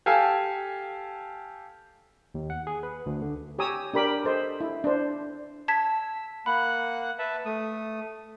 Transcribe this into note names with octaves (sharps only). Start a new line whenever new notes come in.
G4 A4 F5 G#5 A5
D#2
F#5
G#4
B4
D2
D3
G4 C#5 G#5 A#5 D#6 E6
D4 G4 A#4 B5 D6
A4 C5 D#5
E4
D4 C5
A5 E6 G#6 B6
A#3 F#5 B5 F#6
B4 E5 A5
A3 D#6